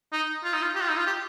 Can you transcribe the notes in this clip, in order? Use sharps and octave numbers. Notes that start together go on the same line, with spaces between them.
D#4
F4
D#4
F4
G4
F4
D#4
F4
G4